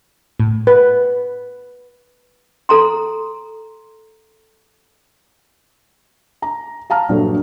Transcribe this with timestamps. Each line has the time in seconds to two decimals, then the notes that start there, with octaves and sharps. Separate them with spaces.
0.39 A2
0.67 B4
2.69 A4 A#5 C6
6.42 A#5
6.90 F5 A5 A#5 F6
7.09 A#1 G2 F#3 D4 A4